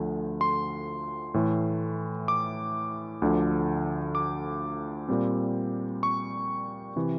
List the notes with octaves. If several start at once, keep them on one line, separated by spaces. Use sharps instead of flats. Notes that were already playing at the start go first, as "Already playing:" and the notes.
Already playing: D2 D3 F3 A3
C6
A2 E3 A3
D6
D2 D3 F3
D6
A#2 G3 C4
C#6
C3 E3